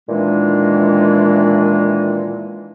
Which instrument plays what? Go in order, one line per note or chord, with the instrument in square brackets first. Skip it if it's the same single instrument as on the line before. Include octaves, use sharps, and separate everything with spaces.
[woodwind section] A#2 D#3 E3 G#3 D4